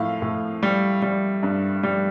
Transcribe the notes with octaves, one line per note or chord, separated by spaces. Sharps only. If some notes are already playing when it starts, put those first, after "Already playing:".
Already playing: A2 F3 F5
A2
G3
G3
G2
G3